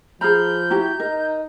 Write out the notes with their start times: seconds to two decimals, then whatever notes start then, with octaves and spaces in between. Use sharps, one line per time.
0.21 F3 G#4 A#5 B5 F6 G6
0.70 E4 F#4 G4 A#5
1.00 D#4 A#4